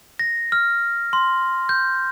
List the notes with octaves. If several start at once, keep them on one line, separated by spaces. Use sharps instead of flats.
A#6
F6
C6
G6